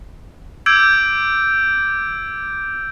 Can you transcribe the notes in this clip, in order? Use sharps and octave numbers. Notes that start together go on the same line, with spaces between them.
D6 E6 G6 G#6 D7